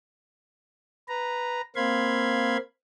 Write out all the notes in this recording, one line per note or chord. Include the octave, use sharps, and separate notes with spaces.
B4 A#5
A#3 C4 F5 B5 C6 G#6